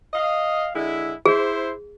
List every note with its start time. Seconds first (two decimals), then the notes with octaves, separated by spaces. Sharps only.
0.14 D#5 F5
0.75 D3 G#3 E4
1.26 E4 G#4 C5